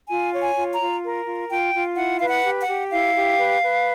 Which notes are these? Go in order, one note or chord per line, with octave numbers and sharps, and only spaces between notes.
F4 G#5
C#5
G#5
F4
A#5
F4
A#4
F4
F4 G5
F4
E4 F#5
B4 F5
F#5
G4
F#5
G4
E4 F5
G4
B4
B4